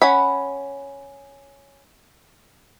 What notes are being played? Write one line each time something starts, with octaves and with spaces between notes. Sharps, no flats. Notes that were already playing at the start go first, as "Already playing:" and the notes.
C#4 F#5 B5